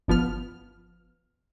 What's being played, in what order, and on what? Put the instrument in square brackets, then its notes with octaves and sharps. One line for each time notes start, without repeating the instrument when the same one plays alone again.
[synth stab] G1 F3 B3 F6